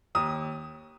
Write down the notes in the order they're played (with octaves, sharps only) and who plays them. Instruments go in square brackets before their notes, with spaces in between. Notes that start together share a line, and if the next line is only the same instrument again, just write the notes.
[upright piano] D#2 D#6